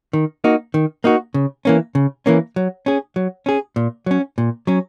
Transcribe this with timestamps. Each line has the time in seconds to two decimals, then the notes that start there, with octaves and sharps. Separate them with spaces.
0.13 D#3
0.44 A#3 D#4 F#4
0.74 D#3
1.04 A#3 D#4 F#4
1.34 C#3
1.65 E3 A#3 C#4
1.95 C#3
2.26 E3 A#3 C#4
2.56 F#3
2.86 C#4 G#4
3.16 F#3
3.46 C#4 G#4
3.76 A#2
4.06 F#3 C#4
4.38 A#2
4.67 F#3 C#4